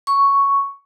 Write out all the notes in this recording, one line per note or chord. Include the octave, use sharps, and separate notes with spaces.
C#6